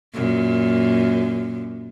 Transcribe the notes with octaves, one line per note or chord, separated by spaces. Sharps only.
F#2 A#2